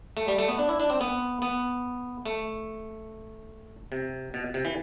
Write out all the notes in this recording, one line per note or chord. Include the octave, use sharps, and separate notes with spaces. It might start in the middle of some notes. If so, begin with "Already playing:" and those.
A3
G3
A3
B3
D4
E4
D4
C4
B3
B3
A3
C3
B2
C3
E3